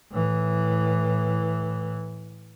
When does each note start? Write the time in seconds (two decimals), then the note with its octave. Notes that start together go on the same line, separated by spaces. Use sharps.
0.11 A2 E3